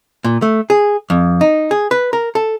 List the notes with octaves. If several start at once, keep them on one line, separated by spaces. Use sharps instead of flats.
A#2
A3
G#4
F2
D#4
G#4
B4
A#4
A4